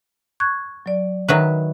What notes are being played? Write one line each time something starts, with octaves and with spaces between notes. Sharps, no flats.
C#6 F#6 G#6
F#3 D5
D#3 F#3 B4 E5